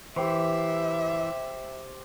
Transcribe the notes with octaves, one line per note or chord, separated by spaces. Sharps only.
E3 G4 C5 E5